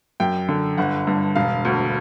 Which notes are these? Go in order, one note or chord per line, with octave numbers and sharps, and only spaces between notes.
F#2 G5
D3
G1 F#5
G2
E1 F5
D2